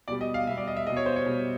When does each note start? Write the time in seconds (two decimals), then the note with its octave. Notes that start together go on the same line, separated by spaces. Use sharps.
0.08 B2 G3 D5
0.21 D#5
0.34 F5
0.47 B2 E5
0.51 G3
0.57 D5
0.68 D#5
0.77 E5
0.86 G3 D#5
0.90 B2
0.97 C#5
1.06 C5
1.16 C#5
1.26 B2 G3